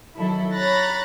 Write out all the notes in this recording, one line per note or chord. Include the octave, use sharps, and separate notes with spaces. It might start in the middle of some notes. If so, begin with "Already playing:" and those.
D#3 F#3 E4 A4
C#5 A#5 B5 F#6 A6 A#6